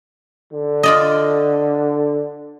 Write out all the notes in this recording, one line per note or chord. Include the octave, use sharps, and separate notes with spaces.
D3
F4 D5 D#5